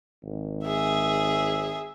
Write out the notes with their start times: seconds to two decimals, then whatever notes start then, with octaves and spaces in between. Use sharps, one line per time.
0.24 G#1
0.64 G#4 E5